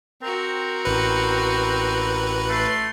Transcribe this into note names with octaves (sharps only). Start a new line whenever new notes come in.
C4 F#4 A#4
A1 B4
A3 C6